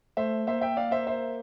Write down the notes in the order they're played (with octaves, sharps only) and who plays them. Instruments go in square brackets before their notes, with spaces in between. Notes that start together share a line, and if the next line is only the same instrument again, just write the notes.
[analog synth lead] A3 [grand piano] C5 E5
[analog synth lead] A#3 [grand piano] C5 E5
[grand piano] E5 G5
D5 F5
C5 E5
C5 E5